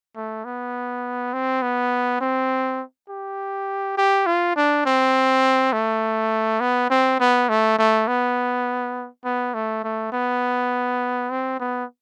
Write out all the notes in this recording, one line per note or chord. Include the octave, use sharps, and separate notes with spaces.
A3
B3
C4
B3
C4
G4
G4
F4
D4
C4
A3
B3
C4
B3
A3
A3
B3
B3
A3
A3
B3
C4
B3